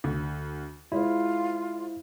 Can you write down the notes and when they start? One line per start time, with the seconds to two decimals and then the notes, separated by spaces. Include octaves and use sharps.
0.04 D2
0.92 G#3 E4 F4 C5